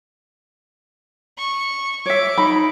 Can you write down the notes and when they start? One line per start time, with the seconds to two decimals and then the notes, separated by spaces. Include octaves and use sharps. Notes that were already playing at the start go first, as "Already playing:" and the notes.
1.38 C#6
2.06 C#5 E5 D6
2.38 D#4 B5